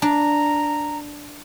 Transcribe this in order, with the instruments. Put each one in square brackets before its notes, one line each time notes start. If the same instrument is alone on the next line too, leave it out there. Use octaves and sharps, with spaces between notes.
[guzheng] D4 [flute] A#5